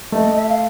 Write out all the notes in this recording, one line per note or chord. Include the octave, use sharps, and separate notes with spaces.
A3 D#5
E5
F5